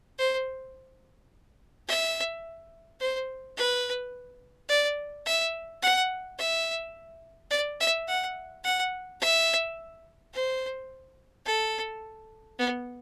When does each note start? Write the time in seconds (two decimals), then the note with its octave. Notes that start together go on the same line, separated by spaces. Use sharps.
0.18 C5
1.87 E5
3.00 C5
3.57 B4
4.69 D5
5.26 E5
5.82 F#5
6.38 E5
7.51 D5
7.80 E5
8.07 F#5
8.64 F#5
9.20 E5
10.33 C5
11.45 A4
12.59 B3